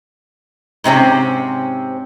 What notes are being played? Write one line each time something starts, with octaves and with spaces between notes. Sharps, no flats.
G#2 C3 C4 C#4